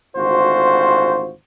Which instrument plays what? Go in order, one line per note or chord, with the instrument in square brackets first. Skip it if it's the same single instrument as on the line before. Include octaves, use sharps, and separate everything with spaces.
[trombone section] G#1 D2 F4 F#4 C5